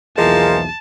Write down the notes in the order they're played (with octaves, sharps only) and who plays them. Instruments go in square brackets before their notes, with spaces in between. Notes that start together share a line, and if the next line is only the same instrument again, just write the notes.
[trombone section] B1 E2 E3 [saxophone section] F3 A#3 [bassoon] G#3 [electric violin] A5